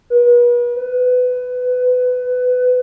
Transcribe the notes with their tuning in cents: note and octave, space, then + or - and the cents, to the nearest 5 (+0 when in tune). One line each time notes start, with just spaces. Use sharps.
B4 -40
B4 +20